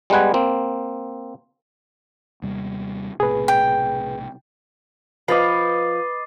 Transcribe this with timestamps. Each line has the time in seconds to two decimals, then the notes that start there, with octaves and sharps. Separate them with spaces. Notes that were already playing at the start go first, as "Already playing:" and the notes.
0.10 G3 G#3 B3 B4 F#5 G#5
0.34 A#3 C4
2.42 D#2 C3 G3
3.20 B1 A2 C3 G#4 B4
3.48 G5
5.28 F3 B4 D#5 D6 A6 C7